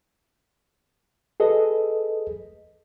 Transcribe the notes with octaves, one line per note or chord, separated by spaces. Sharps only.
G#4 A4 B4 D#5